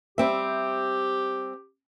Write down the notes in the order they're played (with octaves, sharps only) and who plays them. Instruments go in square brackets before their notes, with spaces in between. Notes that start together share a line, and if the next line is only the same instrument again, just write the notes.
[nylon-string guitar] G3 C4 E5 [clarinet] G4